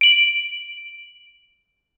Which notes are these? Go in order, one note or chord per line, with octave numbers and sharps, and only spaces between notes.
D7 F#7